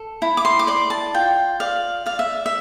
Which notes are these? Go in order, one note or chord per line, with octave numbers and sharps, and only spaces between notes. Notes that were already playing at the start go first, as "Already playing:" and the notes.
Already playing: A4
E4
D6
C6
D6
D5 C6
A5
F4 G5
D5 F5
D5 F5
E5
E5